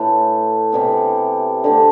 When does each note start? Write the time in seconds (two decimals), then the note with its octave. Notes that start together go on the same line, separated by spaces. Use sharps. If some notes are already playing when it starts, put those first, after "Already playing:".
Already playing: A2 E3 A3 E4
0.72 C3 E3 G3 B3
1.64 D3 A3 C4